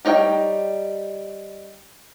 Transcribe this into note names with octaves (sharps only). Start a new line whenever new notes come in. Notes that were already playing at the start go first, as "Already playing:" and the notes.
G3 D#4 C#5 E5 G5